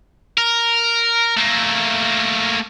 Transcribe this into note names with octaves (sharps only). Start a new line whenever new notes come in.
A#4
A3 A#3